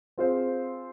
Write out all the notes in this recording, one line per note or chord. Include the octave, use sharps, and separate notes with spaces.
C4 F4 G#4 C5